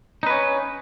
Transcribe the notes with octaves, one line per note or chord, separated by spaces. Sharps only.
C#4 D#4 B4